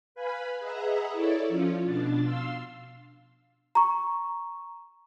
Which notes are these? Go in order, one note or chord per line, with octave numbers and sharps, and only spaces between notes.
B4 F5 G#5 B5
G#4 B4 D#5 E5 F#5 A#5
E4 A4 C#5 D5 E5
F3 C#4 F4
B2 D4 A6
F5 C6 E6
A#5 C#6